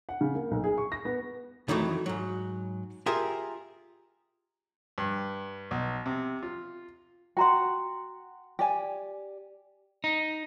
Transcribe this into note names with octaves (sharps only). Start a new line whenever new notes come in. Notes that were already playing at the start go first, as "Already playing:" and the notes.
F#5
C#3
A#3
B1
G#4
C#6
A#6
B3
F2 D#3 E3 F#3 A3
G#2 F#3
F4 G4 G#4 A#4 E5
G2
B1
C3
F4
F#4 F#5 G5 A#5 C6
G4 D5 G#5
D#4